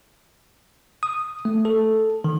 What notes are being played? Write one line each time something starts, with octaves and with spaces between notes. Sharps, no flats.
D#6
A3
A4
D#3